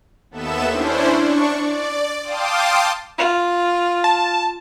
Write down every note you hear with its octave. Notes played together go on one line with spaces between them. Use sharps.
D#2 B3 A4 E5 E7
C#4 D4 E4 C5
D4 C#6
D5
F5 G5 A5 C6 D6 D#6
F4
A5